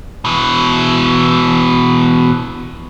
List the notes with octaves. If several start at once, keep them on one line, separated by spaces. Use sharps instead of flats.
B2 E3